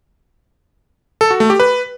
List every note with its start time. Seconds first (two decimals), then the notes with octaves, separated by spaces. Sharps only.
1.21 A4
1.30 F#4
1.40 A3
1.50 G4
1.60 B4